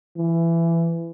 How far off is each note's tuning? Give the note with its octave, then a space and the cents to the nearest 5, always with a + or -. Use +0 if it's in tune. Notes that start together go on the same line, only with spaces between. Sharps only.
E3 +20